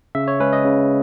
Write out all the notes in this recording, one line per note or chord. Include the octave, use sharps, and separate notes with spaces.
C#3 E5
C#5
G#3 C#4 B4
D#5
C#3